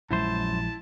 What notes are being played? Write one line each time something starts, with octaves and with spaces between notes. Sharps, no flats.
A#1 F#2 F3 G#3 E4 C5 A5